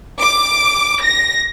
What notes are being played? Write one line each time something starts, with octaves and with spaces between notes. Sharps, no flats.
D6
A#6